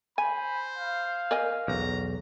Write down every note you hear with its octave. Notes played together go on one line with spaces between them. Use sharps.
C5 G#5 B5
F5
A#4 D#5 G#5
B1 E2 A#5